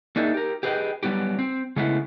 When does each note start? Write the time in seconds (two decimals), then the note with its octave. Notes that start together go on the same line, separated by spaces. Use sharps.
0.16 A#3 D4 D#4 G#4 E5
0.34 G4 A#4
0.63 G4 G#4 B4 C#5 D#5 G5
1.03 F#3 G3 B3 E4 G4
1.39 C4
1.76 C#3 G#3 A3 B3 E4